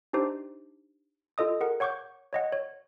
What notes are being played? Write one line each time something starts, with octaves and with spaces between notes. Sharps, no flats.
D4 D#4 G4 C5
F4 A4 D#5 D#6
G#4 A#4 F#5
C#5 F#5 C#6 D6 G6
C#5 D#5 F#5
C#5